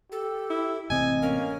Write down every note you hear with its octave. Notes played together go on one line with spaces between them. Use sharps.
G4 A4
E4
A1 C3 C4 D#5 G#5
A#3 C#4